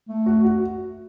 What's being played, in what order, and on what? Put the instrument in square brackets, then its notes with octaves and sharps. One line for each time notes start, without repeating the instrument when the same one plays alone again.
[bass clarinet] A3
[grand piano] F#4
F#4